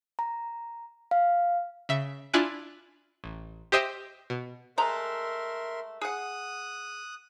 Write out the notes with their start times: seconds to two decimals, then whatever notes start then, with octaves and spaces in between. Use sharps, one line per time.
0.19 A#5
1.11 F5
1.89 C#3 E5
2.33 D4 E4 F4 G#5 F#6 D7
3.24 A1
3.72 G4 C5 D#5 E5 G5
4.30 B2
4.78 G#3 A3 A#4 E5 A#5 C6
6.01 G#4 F#5 D#6 F#6